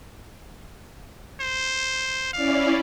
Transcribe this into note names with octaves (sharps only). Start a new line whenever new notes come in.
C5
C#4 E4 D5 F5